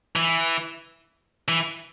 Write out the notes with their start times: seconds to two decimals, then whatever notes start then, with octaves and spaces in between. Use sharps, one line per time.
0.16 E3
1.48 E3